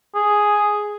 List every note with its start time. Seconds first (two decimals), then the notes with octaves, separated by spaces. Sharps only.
0.15 G#4